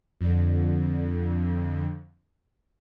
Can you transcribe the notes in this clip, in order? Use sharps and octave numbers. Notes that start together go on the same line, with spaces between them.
F2 D3